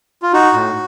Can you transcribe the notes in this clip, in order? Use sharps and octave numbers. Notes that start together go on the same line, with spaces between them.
F4
D#4 F#4
A2